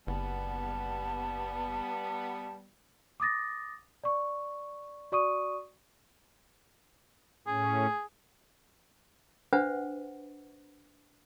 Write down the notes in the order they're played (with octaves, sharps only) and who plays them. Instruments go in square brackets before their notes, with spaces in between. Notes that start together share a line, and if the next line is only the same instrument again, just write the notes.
[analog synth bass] F#1 [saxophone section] G3 B3 [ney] A5
[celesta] D6 D#6 A6 A#6
D5 C#6
F#4 D5 C#6 D#6 D#7
[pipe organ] A2 C#4 [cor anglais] G#4
[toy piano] D4 B4 C5 E5 F#5